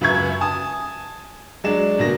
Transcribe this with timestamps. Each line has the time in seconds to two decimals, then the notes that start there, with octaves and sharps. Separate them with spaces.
0.01 C#2 F#2 B4 E5 C#6 G#6
0.41 G#5 A5 D#6
1.64 F#3 G#3 D4 D5 E7
1.98 G1 B2 A#3 A#6